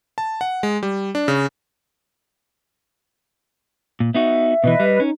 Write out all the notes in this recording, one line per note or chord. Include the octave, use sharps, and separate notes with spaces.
A5
F#5
G#3
G3
D4
C#3
A#2
B3 D#4 F#4 E5
B2 D#3 E3 B4 D#5
G3
C#4 D#4